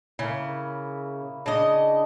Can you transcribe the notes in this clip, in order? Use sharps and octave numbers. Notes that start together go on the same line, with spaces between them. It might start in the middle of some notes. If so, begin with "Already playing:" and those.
C#3 A#3 E4
C#3 D4 D#5